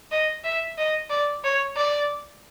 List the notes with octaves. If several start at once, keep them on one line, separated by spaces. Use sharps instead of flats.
D#5
E5
D#5
D5
C#5
D5